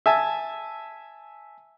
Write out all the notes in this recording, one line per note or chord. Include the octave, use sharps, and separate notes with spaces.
E5 G#5 A5